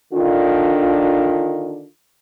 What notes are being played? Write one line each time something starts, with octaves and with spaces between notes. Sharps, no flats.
D3 D#3 D4 F4